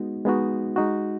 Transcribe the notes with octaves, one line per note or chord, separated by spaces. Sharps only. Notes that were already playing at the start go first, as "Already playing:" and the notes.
Already playing: G#3 B3 D#4 F#4
G#3 B3 D#4 F#4
G#3 D#4 F#4